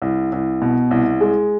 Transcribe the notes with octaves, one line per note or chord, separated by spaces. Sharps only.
C2
C2
B2
C2
G#3